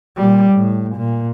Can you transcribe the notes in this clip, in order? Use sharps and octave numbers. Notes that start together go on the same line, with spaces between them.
A#2 G3
A2
A#2